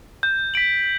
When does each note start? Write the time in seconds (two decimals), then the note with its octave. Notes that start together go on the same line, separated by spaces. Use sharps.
0.23 G6
0.54 B6 D7 F#7